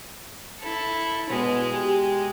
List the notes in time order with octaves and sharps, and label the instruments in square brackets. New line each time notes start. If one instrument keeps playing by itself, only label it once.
[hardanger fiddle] E4 A4
[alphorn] B2 [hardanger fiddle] G#3
[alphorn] G4